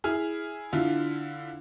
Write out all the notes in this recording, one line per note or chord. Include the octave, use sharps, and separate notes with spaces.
E4 G#4 F6
D3 E4 F4